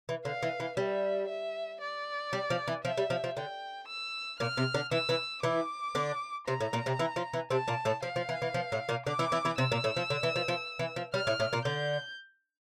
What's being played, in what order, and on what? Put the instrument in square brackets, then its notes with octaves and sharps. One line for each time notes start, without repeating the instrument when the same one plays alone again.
[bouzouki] E3
[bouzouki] D3 [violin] F5
[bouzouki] E3
E3
[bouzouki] G3 [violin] E5
[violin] E5
D5
[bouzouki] G3
F3
E3
[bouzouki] F3 [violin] E5
[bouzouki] G3
F3
F3
[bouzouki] D3 [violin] G5
[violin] E6
[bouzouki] A#2 A#3 [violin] F6
[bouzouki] C3 C4
D3 D4
[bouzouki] E3 E4 [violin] E6
[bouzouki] E3 E4
[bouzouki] E3 E4 [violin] D6
[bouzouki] D3 D4
[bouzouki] C3 C4 [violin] A#5
[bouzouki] A2 A3
A#2 A#3
C3 C4
E3 E4
F3 F4
E3 E4
[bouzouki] C3 C4 [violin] A5
[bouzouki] A#2 A#3
A2 A3
[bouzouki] F3 [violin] F5
[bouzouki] F3
E3
E3
F3
A2 A3
A#2 A#3
[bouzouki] D3 D4 [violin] D6
[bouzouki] E3 E4
E3 E4
E3 E4
[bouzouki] C3 C4 [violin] E6
[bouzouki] A#2 A#3
A2 A3
F3
D3
E3
F3
F3
E3
F3
[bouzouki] G3 [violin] F6
[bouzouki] A2 A3
A2 A3
A#2 A#3
[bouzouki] D3 D4 [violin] G6